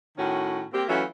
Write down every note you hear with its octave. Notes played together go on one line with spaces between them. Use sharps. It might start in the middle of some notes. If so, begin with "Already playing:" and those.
A2 D#3 C#4 F#4
A#3 C4 G4
E3 F#3 A3 C#4 F4